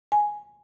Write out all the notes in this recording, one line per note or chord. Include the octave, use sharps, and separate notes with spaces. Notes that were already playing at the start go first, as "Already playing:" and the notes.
G#5